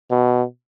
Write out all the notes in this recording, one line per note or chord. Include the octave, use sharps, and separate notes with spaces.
B2